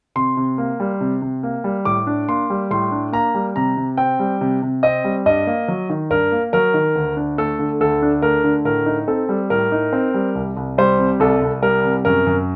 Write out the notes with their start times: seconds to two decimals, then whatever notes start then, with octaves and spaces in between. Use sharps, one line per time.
0.16 C3 C6
0.37 C3
0.58 A#3
0.80 G3
1.01 C3
1.22 C3
1.43 A#3
1.64 G3
1.85 A2 D6
2.07 D4
2.29 A#3 C6
2.50 G3
2.71 A2 C6
2.91 D4
3.13 A#3 A#5
3.35 G3
3.56 C3 A#5
3.77 C3
3.98 C4 G5
4.19 G3
4.41 C3
4.62 C3
4.83 C4 D#5
5.04 G3
5.26 G2 D#5
5.47 A#3
5.68 F#3
5.90 D#3
6.10 G2 A#4
6.32 A#3
6.53 F#3 A#4
6.74 D#3
6.95 D2
7.17 D4
7.38 A3 A4
7.59 D3
7.80 D2 A4
8.02 D4
8.22 A3 A#4
8.44 D3
8.65 A2 A#4
8.86 D#4
9.08 C4 A4
9.29 G3
9.50 A2 A#4
9.72 D#4
9.93 C4
10.14 G3
10.35 C2
10.57 C2
10.78 G3 C5
10.99 C3
11.20 C2 A4
11.42 C2
11.62 G3 A#4
11.84 C3
12.05 F#2 A#4
12.27 F#2